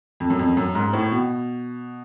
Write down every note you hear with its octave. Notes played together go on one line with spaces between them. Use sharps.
F2
F#2
F2
F#2
G#2
A2
B2